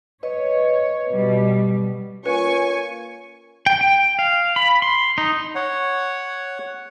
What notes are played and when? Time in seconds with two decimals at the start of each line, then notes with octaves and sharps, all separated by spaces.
0.23 B4 C#5 D#5
1.09 B2 G3
2.26 A#3 C#4 F4 B4 G#5 C#6
3.66 G5
3.81 G5
4.19 F5
4.56 B5
4.82 C6
5.18 D#4
5.55 C#5 F#5